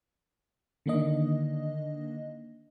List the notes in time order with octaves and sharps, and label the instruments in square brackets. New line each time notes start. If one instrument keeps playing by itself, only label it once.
[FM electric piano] D3 D#3 A#3 D4 D#5